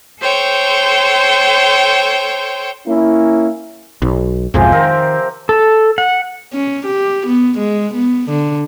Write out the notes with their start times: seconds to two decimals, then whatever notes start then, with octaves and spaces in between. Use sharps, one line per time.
0.18 A4 C5 C#5 G5
2.87 A#3 C#4 E4
4.02 B1
4.54 B1 F2 G#2 C3 F3 G#5
4.72 D#3 C4 A#4 C5
5.49 A4
5.98 F#5
6.54 C#4
6.86 G4
7.27 B3
7.58 G#3
7.94 B3
8.30 D3